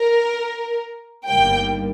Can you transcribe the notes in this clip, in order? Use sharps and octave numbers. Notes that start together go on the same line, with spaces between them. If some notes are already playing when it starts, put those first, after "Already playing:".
Already playing: A#4
G1 G2 D#3 G3 A#3 G5